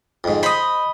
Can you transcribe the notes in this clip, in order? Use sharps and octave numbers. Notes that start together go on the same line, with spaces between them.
F2 G#2
C5 D#5 B5